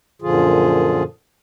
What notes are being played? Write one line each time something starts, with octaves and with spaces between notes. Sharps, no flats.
F#2 A#2 D3 F3 F4 G#4